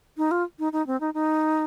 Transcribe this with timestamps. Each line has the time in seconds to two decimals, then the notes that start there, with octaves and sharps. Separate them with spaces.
0.18 D#4
0.31 F4
0.59 D#4
0.73 D#4
0.87 C4
1.00 D#4
1.14 D#4